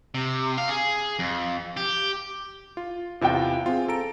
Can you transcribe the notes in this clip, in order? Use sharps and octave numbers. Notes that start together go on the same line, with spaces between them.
C3
F5
G#4
F2
G4
F4
E2 C3 E4 F4 G5
C4 F4 G#4
A4 A#5 D7